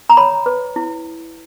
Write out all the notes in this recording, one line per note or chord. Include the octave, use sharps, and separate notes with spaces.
A#5
C#5 B5
B4
E4